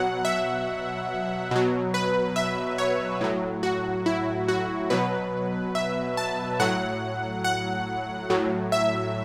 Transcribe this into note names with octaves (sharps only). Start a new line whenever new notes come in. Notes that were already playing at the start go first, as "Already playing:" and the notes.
Already playing: B2 F#3 F#5
E5
B2 F#3
B4
E5
C#5
A2 F#3
F#4
E4
F#4
B2 F#3 B4
E5
A5
A2 F#3 F#5
F#5
A2 F#3
E5